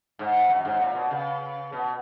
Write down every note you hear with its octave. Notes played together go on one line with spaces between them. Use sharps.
G#2
F#2
G#2
A#2
B2
C#3
B2